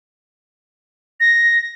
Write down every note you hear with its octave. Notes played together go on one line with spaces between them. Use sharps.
A#6